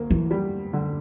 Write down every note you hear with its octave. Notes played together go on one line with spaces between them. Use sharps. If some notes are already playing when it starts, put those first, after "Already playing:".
Already playing: D2 A#3
E3
G3
D3